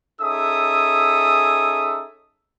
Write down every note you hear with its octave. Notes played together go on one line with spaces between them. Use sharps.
C#4 D#4 G#4 A4 E5 D#6